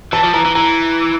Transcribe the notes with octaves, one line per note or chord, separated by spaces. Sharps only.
E3 A5
F3
E3 A#5
E3
E3 A#5